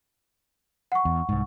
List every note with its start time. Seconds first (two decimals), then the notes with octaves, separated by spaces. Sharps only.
0.92 F#5 C#6
1.05 E2
1.29 C2 G#2